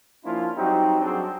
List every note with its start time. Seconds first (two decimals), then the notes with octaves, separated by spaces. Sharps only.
0.25 F3 A#3 C#4 D4 E4 F4
0.56 F#3 G3 C4 D#4 F#4 G4
1.01 F#3 G3 C4 D4 F#4 G#4